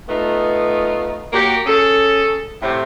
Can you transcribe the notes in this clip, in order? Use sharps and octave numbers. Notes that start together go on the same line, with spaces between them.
A3 B3 D#4 F4
A#3 F#4 G4
C#4 G#4 A4
A2 C3